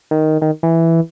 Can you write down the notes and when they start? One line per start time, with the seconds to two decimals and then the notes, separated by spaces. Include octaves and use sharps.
0.11 D#3
0.42 D#3
0.63 E3